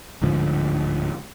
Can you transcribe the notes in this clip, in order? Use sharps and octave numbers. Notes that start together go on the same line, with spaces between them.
D1 G#2 D3 F3